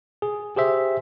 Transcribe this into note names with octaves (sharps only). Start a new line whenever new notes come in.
G#4
G4 G#4 C5 E5